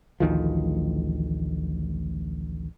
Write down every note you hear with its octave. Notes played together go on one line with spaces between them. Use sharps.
A1 D2 D#3 F3